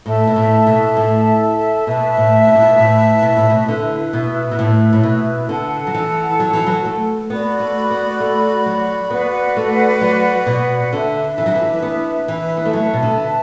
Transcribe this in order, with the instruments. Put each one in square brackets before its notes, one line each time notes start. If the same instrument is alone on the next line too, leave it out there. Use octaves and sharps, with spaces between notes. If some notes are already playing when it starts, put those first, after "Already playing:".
[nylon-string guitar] A2 [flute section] A4 E5 A5
[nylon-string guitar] B2
A2
B2
A2
[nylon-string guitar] B2 [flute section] B4 E5 A5
[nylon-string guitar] A2
B2
A2
B2
A2
B2
A2
B2
[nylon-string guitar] D3 [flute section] E4 B4 E5
[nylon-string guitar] B2
B2
A2
A2
B2
[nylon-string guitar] D3 [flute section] A4 F#5 A5
[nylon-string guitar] F#3
E3
F#3
E3
F#3
A3
[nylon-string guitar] B3 [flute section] F#4 D5 B5
[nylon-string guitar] A3
B3
A3
F#3
[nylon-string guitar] B3 [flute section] F#4 B4 D5 F#5
[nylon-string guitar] A3
F#3
B2
[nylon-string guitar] D3 [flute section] D4 B4 E5
[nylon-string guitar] E3
F#3
E3
B3
E3
B3
A3
[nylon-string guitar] F#3 [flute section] B4 E5 A5
[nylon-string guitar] B2
D3